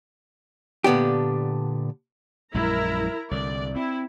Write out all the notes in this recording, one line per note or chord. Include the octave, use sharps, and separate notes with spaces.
A#2 D3 B3 D4 G4
A#1 F#2 G#3 E4 A#4 A#5
C2 D3 D5
C4 E4